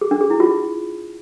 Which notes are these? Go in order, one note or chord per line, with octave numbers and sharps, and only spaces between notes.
G#4
D4
G#4
E4
F4